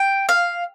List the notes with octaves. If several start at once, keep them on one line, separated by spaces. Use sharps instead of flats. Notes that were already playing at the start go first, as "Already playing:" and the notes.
Already playing: G5
F5